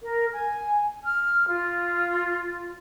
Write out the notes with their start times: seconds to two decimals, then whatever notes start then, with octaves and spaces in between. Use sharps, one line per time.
0.02 A#4
0.32 G#5
1.03 F6
1.46 F4